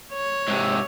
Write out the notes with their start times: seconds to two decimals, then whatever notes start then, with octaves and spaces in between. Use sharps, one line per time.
0.13 C#5
0.48 G#2 C3